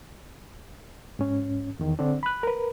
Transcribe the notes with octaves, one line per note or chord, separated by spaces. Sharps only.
G#2 C#4
E2 D#3
D3 C4 D4
B5 F#6
A#4 B4